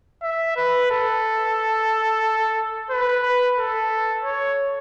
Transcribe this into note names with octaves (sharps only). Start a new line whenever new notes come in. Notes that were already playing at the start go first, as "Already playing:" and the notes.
E5
B4
A4
B4
A4
C#5